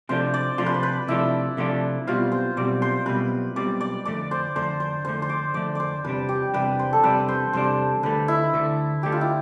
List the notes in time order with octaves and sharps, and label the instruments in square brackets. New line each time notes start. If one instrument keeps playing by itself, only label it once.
[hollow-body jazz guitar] C3 F3 A3 D4 F4 [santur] C5
[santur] D5
[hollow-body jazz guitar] C3 F3 A3 D4 F4 [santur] C5
[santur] B4
C5
B4
[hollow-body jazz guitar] C3 F3 A3 D4 F4 [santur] E4
[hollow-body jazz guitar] C3 F3 A3 D4 F4
[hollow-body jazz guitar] B1 B2 G3 C4 [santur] F4
[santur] C5
[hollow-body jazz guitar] B1 B2 G3 C4 [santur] D5
[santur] C5
[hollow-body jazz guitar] B1 B2 G3 C4 [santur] B4
[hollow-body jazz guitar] B1 B2 G3 C4 [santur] D5
[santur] D5
[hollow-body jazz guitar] F2 D3 A3 [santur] D5
[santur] C5
[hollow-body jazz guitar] F2 D3 A3 [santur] C5
[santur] C5
[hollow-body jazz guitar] F2 D3 A3 [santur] C5
[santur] C5
D5
[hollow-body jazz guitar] F2 D3 A3 [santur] D5
[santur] C5 D5
[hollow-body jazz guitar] E2 C3 G3 D4 [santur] B4
[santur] G4
[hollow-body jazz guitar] E2 C3 G3 D4 [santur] B4
[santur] C5
A4
[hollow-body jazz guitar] E2 C3 G3 D4 [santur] B4
[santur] C5
[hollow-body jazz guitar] E2 C3 G3 D4 [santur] C5
[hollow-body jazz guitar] D2 D3 A3 [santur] B4
[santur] E4
[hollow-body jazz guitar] D2 D3 A3
[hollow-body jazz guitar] D2 D3 A3 [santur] G4
[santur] F4
E4